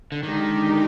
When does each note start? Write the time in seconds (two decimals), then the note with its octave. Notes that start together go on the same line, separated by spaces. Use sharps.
0.12 D3
0.23 D3 D#3 G#3 D#4 G4